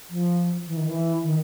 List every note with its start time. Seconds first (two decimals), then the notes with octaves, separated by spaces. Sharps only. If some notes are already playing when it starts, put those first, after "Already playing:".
0.10 F3
0.67 E3
0.77 D#3
0.87 E3
1.24 D#3